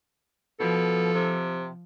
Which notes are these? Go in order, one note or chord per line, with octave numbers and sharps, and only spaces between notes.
B2 F3 A4
C3